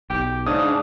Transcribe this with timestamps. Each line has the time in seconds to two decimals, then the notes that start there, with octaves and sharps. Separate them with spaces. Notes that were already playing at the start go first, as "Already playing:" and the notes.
0.10 B1 G4
0.47 G#2 C#3 D4 D#6